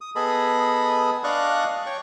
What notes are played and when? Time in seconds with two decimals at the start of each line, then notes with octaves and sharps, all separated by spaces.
0.01 D#6
0.16 B3 G#4 A4 D#5 B5
1.24 D4 D5 D#5 F5 C#6 F#6
1.86 C#5 G5 C#6